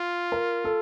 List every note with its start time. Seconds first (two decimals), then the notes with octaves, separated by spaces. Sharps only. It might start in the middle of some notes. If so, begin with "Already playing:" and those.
Already playing: F4
0.32 A#4
0.65 A4